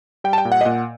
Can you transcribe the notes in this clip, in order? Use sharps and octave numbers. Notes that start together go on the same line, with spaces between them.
G3 G5
A5
G5
A#2
F#5
D#5
A#2 F#5